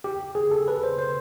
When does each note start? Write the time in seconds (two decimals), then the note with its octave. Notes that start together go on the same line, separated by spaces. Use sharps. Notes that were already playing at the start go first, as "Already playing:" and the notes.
0.04 G4
0.35 G#4
0.51 A4
0.68 B4
0.83 C5
0.99 C5